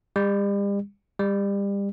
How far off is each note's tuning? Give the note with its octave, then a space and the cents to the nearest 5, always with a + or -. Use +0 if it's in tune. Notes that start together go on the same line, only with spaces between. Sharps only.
G3 +40
G3 +30